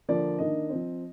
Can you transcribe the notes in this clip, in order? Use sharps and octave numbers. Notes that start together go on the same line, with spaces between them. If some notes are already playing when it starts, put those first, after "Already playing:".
D3 F3 A#3 D5
D#3 A#3 D4 D#5
F3 C4